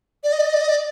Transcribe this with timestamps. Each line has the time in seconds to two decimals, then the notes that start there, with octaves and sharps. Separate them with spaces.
0.24 D5
0.32 D#5
0.39 D5
0.46 D#5
0.54 D5
0.61 D#5
0.69 D5